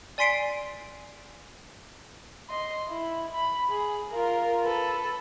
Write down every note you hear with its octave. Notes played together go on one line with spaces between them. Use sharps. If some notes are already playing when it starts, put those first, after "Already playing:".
D5 G#5 C6 B6 C7 D7
D#5 C6
E4
B5
G#4
F4 A#4
A4 B4